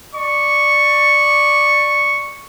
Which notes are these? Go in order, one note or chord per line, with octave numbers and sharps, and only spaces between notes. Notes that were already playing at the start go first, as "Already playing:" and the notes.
D5 C#6